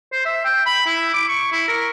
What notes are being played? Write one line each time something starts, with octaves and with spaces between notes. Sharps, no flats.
C5
E5
G5
B5
E4
D6
C#6
E4
A#4